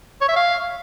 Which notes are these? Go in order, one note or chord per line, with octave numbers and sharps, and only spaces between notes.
C#5
E5
F5